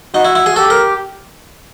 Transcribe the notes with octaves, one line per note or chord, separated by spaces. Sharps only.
D#4 F#4
E4
E4
G#4
G4 A4
A#4